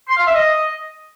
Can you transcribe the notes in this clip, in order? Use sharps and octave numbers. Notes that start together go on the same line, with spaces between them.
C6
F5
E5
D#5